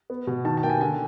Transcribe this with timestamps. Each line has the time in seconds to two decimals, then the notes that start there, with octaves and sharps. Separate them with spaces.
0.10 B3
0.27 B2
0.45 D#3 A5
0.57 A5
0.63 A#3 G5
0.70 G#5
0.81 D3 G#5